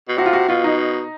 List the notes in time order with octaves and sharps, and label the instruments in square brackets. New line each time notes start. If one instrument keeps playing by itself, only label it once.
[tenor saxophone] B2
[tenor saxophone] C3 [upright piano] F#4
[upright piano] F4
F#4
[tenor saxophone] B2 [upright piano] F4
[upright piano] D#4